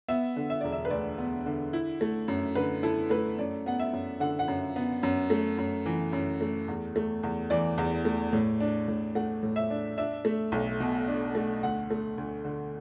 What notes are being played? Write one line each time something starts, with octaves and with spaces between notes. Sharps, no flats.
B3 E5
D3
E5
E1 D5
E5
B4
D2 D5
B3
D3
E4
A3
F#2
D3 B4
E4 A4
A3 B4
F#2 D5
B3 F#5
E5
F#2
D3 F#5
F#5
F#2
B3
F#2
A3
F#2
E3
F#2
A3
E2
A3
E2
E3 D5
E2
A3
A2
D4
A2
A3 F#5
A2
E5
D4
D4 E5
A3
B1
B2
D4
A3
D2 F#5
A3
D2
D3